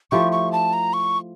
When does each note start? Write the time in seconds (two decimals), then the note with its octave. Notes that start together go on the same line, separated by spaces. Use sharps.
0.11 F3 A3 E4 G4 C#6
0.32 C#6
0.52 A5
0.73 A#5
0.93 C#6